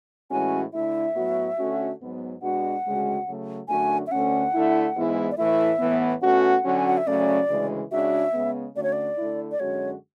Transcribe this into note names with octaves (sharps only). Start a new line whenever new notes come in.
A2 E3 G#3 C#4 F#4 G#5
D3 A3 E4 E5
A2 F#3 B3 F#4
D3 A3 C#4 F#4
G#2 F#3 B3
B2 G#3 D4 F#4 F#5
D2 C#3 G#3 C#4 F#4
C#3 F#3 A3
F#2 D3 A3 D4 F#4 G#5
E5
D2 D3 A3 C#4 F#5
D3 A3 E4
G#2 E3 G#3 B3 E4
D5
A2 E3 A3 E4 E5
A2 E3 B3
B2 A3 C#4 F#4 F#5
D3 F#3 C#4 F#4
G#5
F#5
E5
C#3 F#3 A3 C#4 D5
D2 C#3 E3 G#3
C#3 G#3 D4 F#4 E5
C#3 G#3 B3
D2 D3 A3 C#4 F#4 D5
C#5
D5
D3 A3 E4
D5
F#2 D3 G#3 C#4 F#4 C#5